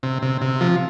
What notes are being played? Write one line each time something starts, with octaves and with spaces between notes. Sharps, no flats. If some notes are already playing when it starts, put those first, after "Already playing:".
C3
C3
C3
F3